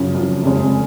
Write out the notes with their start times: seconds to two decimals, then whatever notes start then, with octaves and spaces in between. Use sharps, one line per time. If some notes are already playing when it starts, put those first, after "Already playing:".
Already playing: F#2 C#3 F3
0.14 F#2 C#3 F3
0.43 F1 F2 C#3 G#3